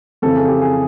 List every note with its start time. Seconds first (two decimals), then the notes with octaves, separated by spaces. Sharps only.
0.22 F2 C#3 E3 A4
0.36 G#4
0.48 G4
0.62 G#4